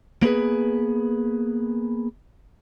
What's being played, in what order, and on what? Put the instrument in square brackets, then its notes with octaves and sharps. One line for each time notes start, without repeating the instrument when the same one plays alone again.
[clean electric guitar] A#3 B3 G#4 B4